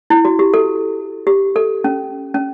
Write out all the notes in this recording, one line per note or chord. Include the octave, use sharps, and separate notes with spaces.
E4
F#4
G4
A4
G4
A4
C#4
C#4